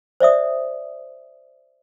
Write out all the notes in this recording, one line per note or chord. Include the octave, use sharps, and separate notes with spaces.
C5 D5 E5 D#6